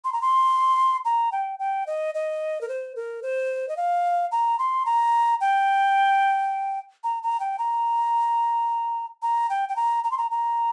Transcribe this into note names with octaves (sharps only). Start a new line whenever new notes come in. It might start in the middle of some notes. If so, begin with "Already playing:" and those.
C6
A#5
C6
A#5
G5
G5
D#5
D#5
A#4
C5
A#4
C5
D#5
F5
A#5
C6
A#5
G5
A#5
A#5
G5
A#5
A#5
G5
G5
A#5
A#5
C6
A#5
A#5